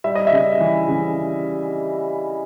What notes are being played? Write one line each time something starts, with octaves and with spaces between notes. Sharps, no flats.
G3 E5
D#5
E5
C#3
E3
C#3